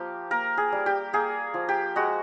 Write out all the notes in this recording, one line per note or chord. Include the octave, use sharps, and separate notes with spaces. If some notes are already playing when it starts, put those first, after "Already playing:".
Already playing: F3 A#3 G4
A#3 A#4
G#4
G3
G4
A#3 G#4
F3
G4
G#3 F#4